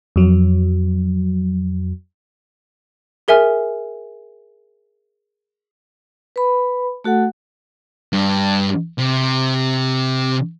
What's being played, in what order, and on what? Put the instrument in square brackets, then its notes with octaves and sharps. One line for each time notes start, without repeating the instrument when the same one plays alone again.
[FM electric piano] F2 F#3
[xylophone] G#4 A#4 E5 G#5 F6
[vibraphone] B4 B5
A3 F#4 A4 F#5
[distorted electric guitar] G2
C3